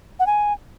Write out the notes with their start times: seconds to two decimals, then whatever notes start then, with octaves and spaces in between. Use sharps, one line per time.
0.19 F#5
0.26 G#5